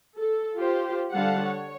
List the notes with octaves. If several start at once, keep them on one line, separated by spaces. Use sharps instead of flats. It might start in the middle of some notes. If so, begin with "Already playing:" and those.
A4
F4 G4 C5
D3 G3 F5 F#5 A5
C#5